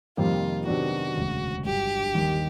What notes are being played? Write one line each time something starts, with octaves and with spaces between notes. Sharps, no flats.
F2 C3 D#3 G3 A#3 F4
C3 D#3 F#3 B3 D4 F#4
E1 D2 C#3
G1 G2 D3 F#3 G4
D#2 D#3 G3